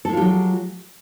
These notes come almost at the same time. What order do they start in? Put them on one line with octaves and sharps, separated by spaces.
A4 G#3 F4 G4 F#3